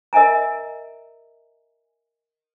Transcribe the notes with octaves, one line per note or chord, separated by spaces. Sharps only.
A#4 D#5 E5 G#5 A#5